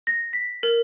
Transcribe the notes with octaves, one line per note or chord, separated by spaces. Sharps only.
A#6
B6
A#4